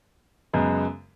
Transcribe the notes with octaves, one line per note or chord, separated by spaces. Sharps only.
F#2 C#3 G#3 B3